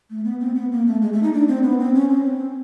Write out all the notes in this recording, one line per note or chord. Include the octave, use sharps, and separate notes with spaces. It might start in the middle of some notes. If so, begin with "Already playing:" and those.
A3
B3
C4
B3
A#3
A3
G#3
A3
D#4
D4
C4
B3
C4
C#4
C4